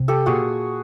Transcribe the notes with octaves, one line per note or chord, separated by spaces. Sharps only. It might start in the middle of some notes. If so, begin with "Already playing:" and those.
Already playing: C3
G4 A4
A#2 F#4 G#4